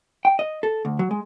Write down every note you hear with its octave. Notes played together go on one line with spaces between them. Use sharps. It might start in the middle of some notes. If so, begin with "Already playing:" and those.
G5
D#5
A4
D2
F#3
G#3